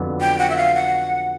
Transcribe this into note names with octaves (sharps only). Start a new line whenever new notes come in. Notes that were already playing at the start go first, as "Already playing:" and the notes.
Already playing: F2 D3 F#3 B3
G5
F#5
E5
F5
F#5